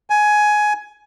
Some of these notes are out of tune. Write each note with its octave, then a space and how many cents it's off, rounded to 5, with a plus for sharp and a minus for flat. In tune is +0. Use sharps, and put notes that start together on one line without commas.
G#5 +15